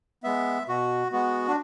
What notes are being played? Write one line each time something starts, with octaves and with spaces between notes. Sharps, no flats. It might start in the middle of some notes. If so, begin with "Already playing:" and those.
G#3 B3 E5
B2 F#4
G#3 B3 F#4
D4